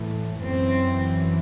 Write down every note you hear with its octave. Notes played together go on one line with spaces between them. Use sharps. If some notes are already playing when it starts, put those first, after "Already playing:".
Already playing: A2 E3
F#2 E3 C4